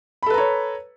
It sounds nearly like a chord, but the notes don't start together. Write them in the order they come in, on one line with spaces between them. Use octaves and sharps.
B5 A4 B4 A#5 C#5